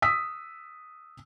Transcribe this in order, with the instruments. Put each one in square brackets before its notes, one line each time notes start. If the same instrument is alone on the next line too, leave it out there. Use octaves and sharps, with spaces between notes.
[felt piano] D#6 E6 B6